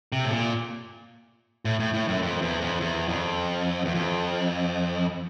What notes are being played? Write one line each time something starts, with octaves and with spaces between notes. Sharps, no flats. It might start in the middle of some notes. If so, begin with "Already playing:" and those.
C3
A2
A#2
A2
A2
A2
F#2
F2
E2
F2
E2
F2
E2
F2